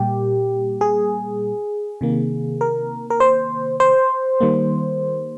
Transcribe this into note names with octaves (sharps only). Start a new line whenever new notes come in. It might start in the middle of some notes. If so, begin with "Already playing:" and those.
Already playing: A#2 G3 A#3 G4
G#4
C3 D#3 A#3
A#4
A#4
C5
C5
D#3 G3 A#3